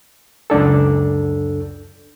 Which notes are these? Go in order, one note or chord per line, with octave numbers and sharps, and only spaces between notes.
C#2 F#2 D4 A4